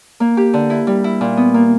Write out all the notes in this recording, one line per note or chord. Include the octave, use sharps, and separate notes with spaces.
A#3
G4
D3
E4
G3
E4
A#2
B3
A#3